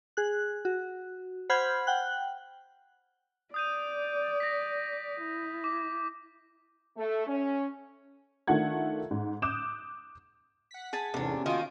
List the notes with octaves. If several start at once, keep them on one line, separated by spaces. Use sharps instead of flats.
G#4 F#6
F#4
C5 F#5 B5 F6 G6 G#6
F#5 G5 F#6
D5 D#6 G6 D#7
A#6 B6
E4
D6
A3
C#4
D#3 A3 D4 F4 F#5 G#6
G#2
D6 D#6 F#6 G6 E7
F#5 B6
G#4 G#5 A5
E2 G#2 C3 A3 B3 C#4 D4
D#3 A#3 F4 F#4 D#6 D7